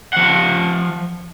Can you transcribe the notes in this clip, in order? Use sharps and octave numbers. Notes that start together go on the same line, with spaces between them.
F3 F#5